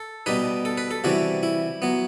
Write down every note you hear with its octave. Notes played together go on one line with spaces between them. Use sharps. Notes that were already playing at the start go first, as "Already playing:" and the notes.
Already playing: A4
B2 G3 D#4 B4
A4
B4
A4
C3 E3 G3 F#4
E4
F#3 B3